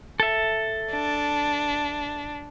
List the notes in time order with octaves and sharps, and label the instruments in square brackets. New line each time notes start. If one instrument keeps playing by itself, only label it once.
[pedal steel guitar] A4 E5
[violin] D4